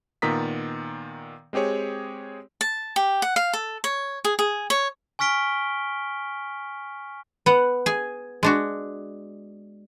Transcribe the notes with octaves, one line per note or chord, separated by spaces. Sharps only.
A#2 D#3 B3 A#5 D#6 B6
G#3 C4 G4 G#4 C#5
A5
G4
F#5
F5
A4
C#5
G#4
G#4
C#5
G#5 C#6 F6 B6 D7 G7
B3 F#5
G#4 G#5
G#3 D4 F#4